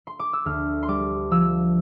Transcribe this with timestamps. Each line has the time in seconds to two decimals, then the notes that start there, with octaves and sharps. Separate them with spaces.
0.07 C6
0.19 D6
0.33 E6
0.45 D2 F6
0.83 C6
0.88 G3 D6
1.31 F3 E6